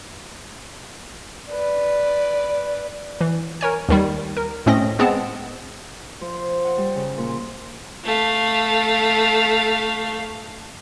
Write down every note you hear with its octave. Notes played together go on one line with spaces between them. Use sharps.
B4 D5
E3
A#4 C#5 G#5
D#2 D#3 G3
A#4
A2 A3 C4 C#4 D#5 A#6
G#3 B3 C4 G#4 A5
F3
C5
F#5
G3
C#3
A#2
A3 F5